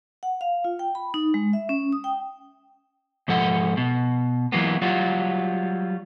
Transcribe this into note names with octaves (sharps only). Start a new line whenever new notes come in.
F#5
F5
F4
G5
B5
D#4
G#3
E5
C#4
D#6
G5
G#2 F3 A4 F#5
B2
E3 F#3 A#3 B3
F#3 G3 F4 F#4